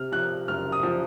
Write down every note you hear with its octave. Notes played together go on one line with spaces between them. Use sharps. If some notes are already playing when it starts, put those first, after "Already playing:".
Already playing: C3 F6
F3 F#6
F#1 F6
D#6
F3